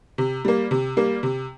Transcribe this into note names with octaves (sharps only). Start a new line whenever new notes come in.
C3
G3 A#3
C3
G3 A#3
C3